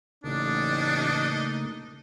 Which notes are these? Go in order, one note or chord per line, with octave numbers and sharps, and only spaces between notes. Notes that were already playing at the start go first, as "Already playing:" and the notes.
A1 C#3 A3 A#3 D4 D#4